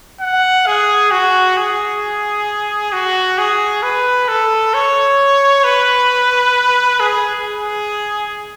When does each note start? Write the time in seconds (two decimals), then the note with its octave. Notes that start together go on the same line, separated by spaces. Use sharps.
0.20 F#5
0.67 G#4
1.11 F#4
1.57 G#4
2.93 F#4
3.38 G#4
3.83 B4
4.29 A4
4.74 C#5
5.64 B4
7.00 G#4
7.45 G#4